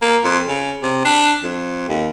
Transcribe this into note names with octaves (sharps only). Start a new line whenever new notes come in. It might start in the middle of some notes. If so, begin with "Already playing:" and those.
A#3
F2
C#3
C3
D4
F2
D#2